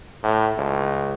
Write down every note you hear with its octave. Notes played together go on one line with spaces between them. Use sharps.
A2
C#2